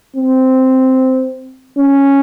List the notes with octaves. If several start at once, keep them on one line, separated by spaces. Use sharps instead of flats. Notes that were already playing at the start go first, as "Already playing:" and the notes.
C4
C#4